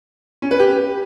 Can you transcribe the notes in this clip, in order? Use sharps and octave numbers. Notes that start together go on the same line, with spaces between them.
C#4
B4
G4